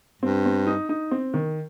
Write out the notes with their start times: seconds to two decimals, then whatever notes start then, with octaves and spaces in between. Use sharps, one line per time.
0.22 G2 C4
0.45 C4
0.67 D#4
0.89 D#4
1.11 C4
1.34 D#3